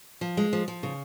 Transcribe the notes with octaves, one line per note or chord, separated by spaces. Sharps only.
F3
G#3
F3
F3
C#3